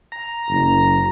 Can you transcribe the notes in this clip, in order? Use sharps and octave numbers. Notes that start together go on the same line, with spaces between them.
A#5
F#1